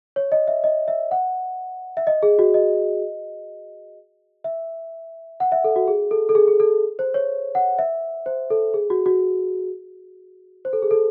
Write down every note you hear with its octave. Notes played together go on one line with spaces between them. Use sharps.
C#5
D#5
E5
D#5
E5
F#5
E5
D#5
G#4
F#4
D#5
E5
F#5
E5
A4
F#4
G#4
A4
A4
G#4
G#4
A4
C5
C#5
F#5
E5
C5
A4
G#4
F#4
F#4
C5
A4
G#4
A4